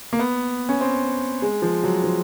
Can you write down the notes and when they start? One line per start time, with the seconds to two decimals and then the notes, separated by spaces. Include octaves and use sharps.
0.13 A#3
0.19 B3
0.69 C#4
0.81 C4
1.42 G#3
1.62 F3
1.84 F#3
2.04 F3